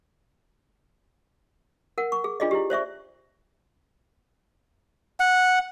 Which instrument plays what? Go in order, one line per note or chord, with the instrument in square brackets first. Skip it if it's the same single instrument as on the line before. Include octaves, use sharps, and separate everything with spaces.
[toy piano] A#4 F#5
C#6
G#4
D4 F4 G#4 D5 D#5
E4 G4
C5 D5 E5 C#6
[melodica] F#5